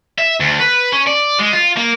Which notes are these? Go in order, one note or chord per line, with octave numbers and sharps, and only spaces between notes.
E5
D2
B4
C#4
D5
G#3
F4
A#3